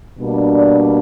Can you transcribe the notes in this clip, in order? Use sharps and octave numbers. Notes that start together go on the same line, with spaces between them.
B2 G3 A#3 D4
D5